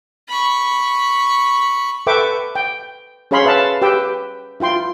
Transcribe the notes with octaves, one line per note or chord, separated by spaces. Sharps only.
B5 C#6
A4 B4 E5 G5 C#6 D6
G5
C#4 G#4 C#5 F5 B5 C6
B4 E5 F5 A5
G4 B4 G5 E6
E4 F4 G5 C6